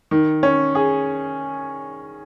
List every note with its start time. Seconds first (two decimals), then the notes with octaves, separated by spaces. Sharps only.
0.11 D#3
0.43 C#4
0.75 G#4